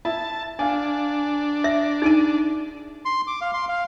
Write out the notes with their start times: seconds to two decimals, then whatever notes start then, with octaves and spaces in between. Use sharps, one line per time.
0.05 E4 E5 A5
0.59 D4 F5 G#5
1.64 E5 A#6
2.02 D#4 G#4 D7 D#7
3.05 C6
3.27 D6
3.41 F5
3.54 C6
3.69 F5